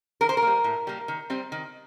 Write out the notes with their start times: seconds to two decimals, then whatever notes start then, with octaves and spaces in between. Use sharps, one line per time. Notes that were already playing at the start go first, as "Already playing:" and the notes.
0.21 D#3 A#4
0.29 C5
0.37 A#4
0.42 G3 A#3
0.64 A2
0.87 G3 A#3
1.08 D#3
1.30 G3 C4
1.52 D#3